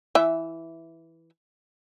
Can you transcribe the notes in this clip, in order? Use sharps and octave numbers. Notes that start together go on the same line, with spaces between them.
E3 E5